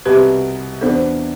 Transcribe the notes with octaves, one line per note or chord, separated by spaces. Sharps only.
C2 B2 B3 G4 B4
E2 B2 B3 D4 A4 C5